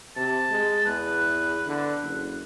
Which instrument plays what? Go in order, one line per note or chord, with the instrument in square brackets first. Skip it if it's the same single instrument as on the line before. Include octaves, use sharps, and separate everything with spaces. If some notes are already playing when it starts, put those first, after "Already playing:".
[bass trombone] C3 [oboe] A5
[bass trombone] G#3
[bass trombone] E2 [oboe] B4
[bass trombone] D3
F#1